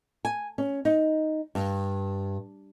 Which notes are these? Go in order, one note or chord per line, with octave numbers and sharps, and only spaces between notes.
G#5
C#4
D#4
G2